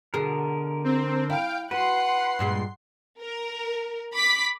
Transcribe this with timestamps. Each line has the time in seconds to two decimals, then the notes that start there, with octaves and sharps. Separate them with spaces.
0.14 B2 D3 G#4 A#4
0.84 C4
1.30 E4 F5 G5 D7
1.71 F#4 B4 F#5 C6 C7
2.39 G2 A#2 G#3
3.21 A#4
4.13 B5 D6 B6